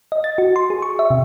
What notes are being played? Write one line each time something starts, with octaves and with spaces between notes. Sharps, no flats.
D#5
A6
F#4
C6
G#4
C#6
E5
C3